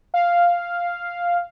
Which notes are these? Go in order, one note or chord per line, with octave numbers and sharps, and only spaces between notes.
F5